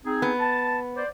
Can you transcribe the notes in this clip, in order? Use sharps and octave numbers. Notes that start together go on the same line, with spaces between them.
C4 D#4 G#4
B3
A5
C5 D5